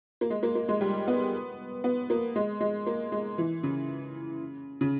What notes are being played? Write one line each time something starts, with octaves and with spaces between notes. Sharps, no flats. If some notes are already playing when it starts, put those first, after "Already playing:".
A#3
G#3
A#3
A#3
G#3
G3
B3
B3
A#3
G#3
G#3
A#3
G#3
E3
C#3
C#3